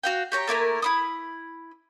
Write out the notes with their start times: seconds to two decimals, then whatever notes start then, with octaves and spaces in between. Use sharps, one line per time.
0.03 F#4 F5 G5
0.32 G4 C#5 A#5
0.47 A3 A#3 E4 A#4
0.82 E4 B5 D#6